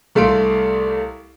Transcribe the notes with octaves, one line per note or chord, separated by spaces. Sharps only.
C2 A3 F5 C6 D7